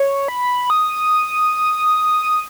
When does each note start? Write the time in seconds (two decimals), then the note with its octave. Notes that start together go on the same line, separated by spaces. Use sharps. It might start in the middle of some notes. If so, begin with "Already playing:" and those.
Already playing: C#5
0.28 B5
0.70 D#6